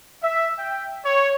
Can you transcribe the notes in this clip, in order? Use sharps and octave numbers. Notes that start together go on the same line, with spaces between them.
E5
G5
C#5